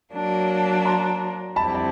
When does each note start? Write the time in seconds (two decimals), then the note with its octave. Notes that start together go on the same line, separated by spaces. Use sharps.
0.13 F#3 A#3 D4
0.85 A#5 C6
1.56 F2 D3 G3 C4 E4 A5 B5
1.75 A5